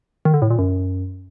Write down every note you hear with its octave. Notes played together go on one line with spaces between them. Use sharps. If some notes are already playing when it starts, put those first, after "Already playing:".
D#3
D3
A2
A#2
F#2